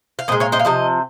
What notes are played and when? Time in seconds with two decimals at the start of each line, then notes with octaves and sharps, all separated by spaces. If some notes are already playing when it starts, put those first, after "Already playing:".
0.19 F5
0.28 A#2 C5 D#5
0.32 G#3
0.40 C#5 F5
0.52 C5 D#5
0.59 F5
0.65 C3 F3 D#5